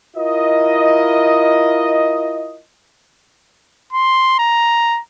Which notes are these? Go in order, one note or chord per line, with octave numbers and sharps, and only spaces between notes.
E4 F4 A#4 D#5
C6
A#5